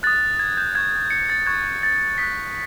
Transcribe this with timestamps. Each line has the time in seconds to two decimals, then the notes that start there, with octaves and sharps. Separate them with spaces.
0.03 D#6 F#6 A6
0.39 G#6
0.57 G6
0.75 C#6 F#6 G#6
1.10 C#7
1.30 A6
1.47 C#6 F#6 G#6
1.65 G#6
1.83 A6
2.18 D#6 F#6 B6